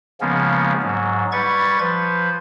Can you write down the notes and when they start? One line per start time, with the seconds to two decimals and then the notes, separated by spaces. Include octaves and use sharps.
0.21 C#3 F3 G#3 A#3 B3 C#4
0.82 G#2 F#3
1.32 G3 B4 C#6 G#6 A6
1.79 F3 B4 C5